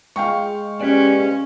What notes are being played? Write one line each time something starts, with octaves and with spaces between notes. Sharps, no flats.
G#3 F5 G5 C#6
C#4 G4 B4 D5